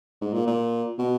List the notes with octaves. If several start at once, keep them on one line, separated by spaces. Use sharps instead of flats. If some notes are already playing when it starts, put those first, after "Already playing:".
G#2
A#2
A#2
B2